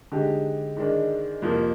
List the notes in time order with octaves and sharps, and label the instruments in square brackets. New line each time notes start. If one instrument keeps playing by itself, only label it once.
[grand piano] D3 G#3 D#4 G4
G#2 D#3 G#3 D4
F2 C3 F3 A#3